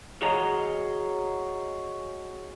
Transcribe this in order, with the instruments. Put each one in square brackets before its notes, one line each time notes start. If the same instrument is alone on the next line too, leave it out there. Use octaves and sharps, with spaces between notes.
[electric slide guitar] F#4 G#4 C#5 D#5 A#5